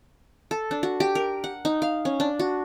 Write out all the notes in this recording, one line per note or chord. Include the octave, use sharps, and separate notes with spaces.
A4
D4
F#4
G4
A#4
F#5
D#4
F5
C#4
D4
F#4